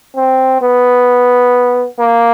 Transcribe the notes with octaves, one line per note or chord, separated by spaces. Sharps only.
C4
B3
A#3